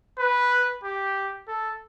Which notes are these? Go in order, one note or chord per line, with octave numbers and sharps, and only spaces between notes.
B4
G4
A4